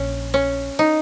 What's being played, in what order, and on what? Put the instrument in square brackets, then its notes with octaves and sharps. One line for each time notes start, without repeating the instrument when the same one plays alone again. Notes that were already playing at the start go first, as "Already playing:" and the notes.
Already playing: [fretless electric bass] A#1 [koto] C#4
[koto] C#4
D#4